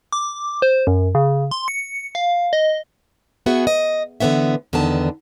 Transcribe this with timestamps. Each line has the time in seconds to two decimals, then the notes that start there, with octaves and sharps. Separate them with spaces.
0.12 D6
0.62 C5
0.87 F#2
1.15 C#3
1.51 C6
1.68 C#7
2.15 F5
2.53 D#5
3.46 B3 F#4 G#4 E5
3.67 D#5
4.20 A2 D3 E3 B3 C#4 E5
4.73 E2 D3 D#3 B3 A5